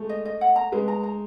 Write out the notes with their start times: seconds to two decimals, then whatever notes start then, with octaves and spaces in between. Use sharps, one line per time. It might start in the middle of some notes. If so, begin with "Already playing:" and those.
Already playing: G#3 A3
0.09 D#5
0.25 D#5
0.41 F#5
0.56 A#5
0.72 G#3 B4
0.88 A#5
1.03 A#5